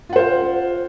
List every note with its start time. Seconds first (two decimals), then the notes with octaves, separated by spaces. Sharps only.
0.09 F4
0.13 F#5
0.16 C5
0.19 F5